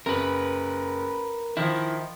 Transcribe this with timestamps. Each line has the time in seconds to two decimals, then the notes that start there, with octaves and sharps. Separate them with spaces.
0.06 F#1 A#4 B4
1.57 D#3 F3 E4